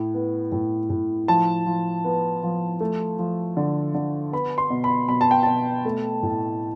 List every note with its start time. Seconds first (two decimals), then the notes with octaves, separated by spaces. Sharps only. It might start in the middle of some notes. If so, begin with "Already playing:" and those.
Already playing: A2
0.14 B3
0.52 A2
0.90 A2
1.28 F3 A5
1.66 F3
2.04 B3
2.43 F3
2.80 A3
3.19 F3
3.57 D3
3.94 D3
4.32 B3 B5
4.58 C6
4.70 B2
4.84 B5
5.09 B2 B5
5.21 A5
5.31 G5
5.43 B2 A5
5.85 A3
6.23 A2